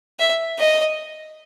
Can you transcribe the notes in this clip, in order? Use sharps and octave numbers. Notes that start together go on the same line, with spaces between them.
E5
D#5